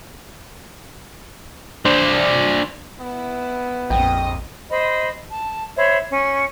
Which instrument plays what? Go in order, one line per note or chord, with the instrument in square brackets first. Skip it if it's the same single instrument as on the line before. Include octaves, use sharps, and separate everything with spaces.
[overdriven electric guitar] D4 C5
[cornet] B3 [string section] E4
[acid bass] A#1 [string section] F2 A#2 D#5 [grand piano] G5
[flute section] C5 D#5 B5
A5
C5 C#5 E5 B5
C#4